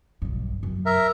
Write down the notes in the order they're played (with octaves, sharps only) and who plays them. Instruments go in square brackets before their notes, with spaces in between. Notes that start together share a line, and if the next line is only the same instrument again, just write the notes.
[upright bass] B1 G2
F#2
[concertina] A#4 E5